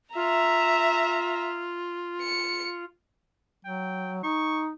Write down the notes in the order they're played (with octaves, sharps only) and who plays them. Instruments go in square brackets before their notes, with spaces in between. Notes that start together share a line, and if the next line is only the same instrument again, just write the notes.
[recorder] F4 [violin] E5 A#5
[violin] C#7
[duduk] F#3 [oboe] G5
[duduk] D#4 [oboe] C#6